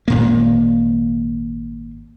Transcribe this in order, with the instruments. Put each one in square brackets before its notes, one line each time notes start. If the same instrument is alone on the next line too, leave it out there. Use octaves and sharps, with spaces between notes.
[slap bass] G#1 A#2 A#3